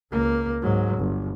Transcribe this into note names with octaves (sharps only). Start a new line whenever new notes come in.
C#2 A#3
G#2 F#3
G1